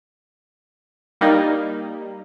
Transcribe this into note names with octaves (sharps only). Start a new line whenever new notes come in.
G3 A#3 D#4